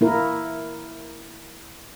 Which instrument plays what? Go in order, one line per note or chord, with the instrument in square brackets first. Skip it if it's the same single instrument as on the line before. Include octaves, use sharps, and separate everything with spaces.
[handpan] A#3 E4 A#4